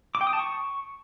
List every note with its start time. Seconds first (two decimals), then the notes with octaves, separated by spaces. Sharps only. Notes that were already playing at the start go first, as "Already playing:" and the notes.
0.15 D6
0.21 G5
0.27 D#6
0.33 A5
0.39 C#6